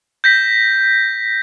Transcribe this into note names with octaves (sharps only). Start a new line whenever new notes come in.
G6 A#6 B6